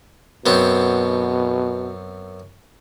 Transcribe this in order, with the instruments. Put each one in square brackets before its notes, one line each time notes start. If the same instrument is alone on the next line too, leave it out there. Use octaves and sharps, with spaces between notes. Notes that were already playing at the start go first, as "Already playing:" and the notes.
[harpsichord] F#2 B3 C4 [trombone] B2